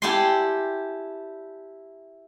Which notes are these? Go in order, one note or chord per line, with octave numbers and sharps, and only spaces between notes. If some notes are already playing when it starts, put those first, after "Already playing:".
E4 G4 A4 D5 G#5 C6